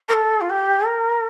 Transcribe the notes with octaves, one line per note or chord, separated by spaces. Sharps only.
A#4
A4
F4
G4
A#4